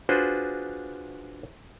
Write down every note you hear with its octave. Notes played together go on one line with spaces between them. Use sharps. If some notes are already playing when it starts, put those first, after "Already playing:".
D4 F4 F#4 G#4 B4 C5